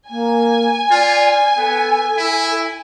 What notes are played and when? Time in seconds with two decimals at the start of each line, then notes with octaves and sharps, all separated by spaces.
0.10 A#3 G#5
0.91 F4 D5
1.57 B3 A4
2.18 E4